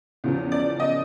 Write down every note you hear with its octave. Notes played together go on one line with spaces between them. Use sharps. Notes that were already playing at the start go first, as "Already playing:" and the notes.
E2 C#3 F3
D5
D#5